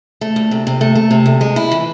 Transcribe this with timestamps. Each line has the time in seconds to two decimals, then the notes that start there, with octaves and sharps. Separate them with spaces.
0.21 A3
0.36 D2
0.51 C3
0.67 C3
0.81 A3
0.95 A3
1.11 C3
1.26 D2
1.41 G#3
1.56 E4
1.71 E3